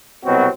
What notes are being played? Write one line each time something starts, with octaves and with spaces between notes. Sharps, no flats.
C2 B2 F#3 C4 F#4